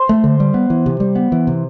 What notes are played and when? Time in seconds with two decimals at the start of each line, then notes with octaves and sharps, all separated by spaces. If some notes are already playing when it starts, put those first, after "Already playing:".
Already playing: C5
0.09 A3
0.24 D3
0.40 G3
0.54 B3
0.70 E3
0.86 C3
1.00 G3
1.15 B3
1.32 E3
1.47 C3